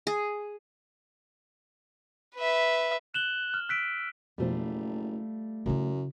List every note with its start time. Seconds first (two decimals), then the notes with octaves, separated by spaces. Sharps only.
0.07 G#4
2.35 B4 E5
3.14 F#6 E7 F#7 G7
3.54 F6
3.69 E6 F#6 B6 D7
4.38 F#1 F2 B2 F3 G3 A3 F4
5.66 F#2 C#3 E4